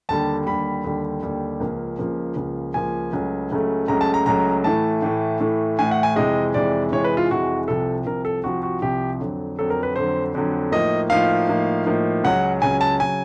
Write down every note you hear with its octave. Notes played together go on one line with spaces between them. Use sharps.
D#2 D3 G3 A5
D#2 D3 G3 B5
D#2 D3 G3
D#2 D3 G3
C#2 C#3 F3 A#3
C#2 C#3 F3 A#3
C#2 C#3 F3 A#3
C#2 C#3 F3 A#3 G#5
C#2 C#3 F#3 A3
C#2 C#3 F#3 A3
C#2 C#3 F#3 A3 A#5
A5
A#5
C#2 C#3 F#3 A3 A#5
A2 E3 A3 A5
A2 E3 A3
A2 E3 A3
A2 E3 A3 G#5
F#5
G#5
F2 C3 E3 G#3 D#5
F2 C3 E3 G#3 D5
F2 C3 E3 G#3 C#5
B4
F4
F2 C3 E3 G#3 F#4
C2 C3 F3 A4
C2 C3 F3 A#4
A4
C2 C3 F3 F#4
F#4
C2 C3 F3 G4
F2 D3 F#3
F2 D3 F#3 A4
A#4
B4
F2 D3 F#3 C5
F2 D3 F#3
A2 F3 A#3 D#4 D#5
A2 F3 A#3 D#4 F5
A2 F3 A#3 D#4
A2 F3 A#3 D#4
C#2 C#3 F#3 F#5
C#2 C#3 F#3 G#5
A5
C#3 F#3 G#5